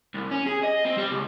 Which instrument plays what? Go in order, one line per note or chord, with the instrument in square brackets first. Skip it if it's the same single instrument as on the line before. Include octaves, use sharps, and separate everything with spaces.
[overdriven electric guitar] C2
C#4
G#4
D#5
C4
G3
C#2